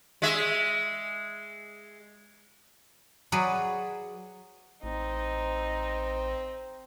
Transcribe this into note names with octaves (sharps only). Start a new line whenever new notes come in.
G#3 E5
F#3 G#4 B4 D5
A1 C4 D#4